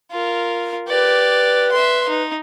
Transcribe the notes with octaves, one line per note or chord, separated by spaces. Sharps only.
F4 A#4
G4 B4 D5
E5 C6
D#4